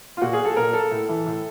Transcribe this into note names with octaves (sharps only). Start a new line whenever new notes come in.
F4
A#2 F#4
G#4
A4
A#2 A#4
A4
A2
E3
A2